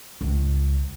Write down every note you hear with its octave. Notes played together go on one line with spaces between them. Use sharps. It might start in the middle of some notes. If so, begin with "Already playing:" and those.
C#2